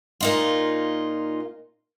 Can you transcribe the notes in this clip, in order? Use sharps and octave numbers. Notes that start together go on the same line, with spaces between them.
A#2 D#4 F4